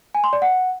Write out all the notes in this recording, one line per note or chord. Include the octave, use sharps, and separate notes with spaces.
G#5
C6
D5
F#5